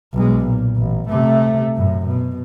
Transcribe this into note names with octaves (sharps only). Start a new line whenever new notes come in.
B1 G#3
A#2
A1
C3 A3
F#2 A2
B2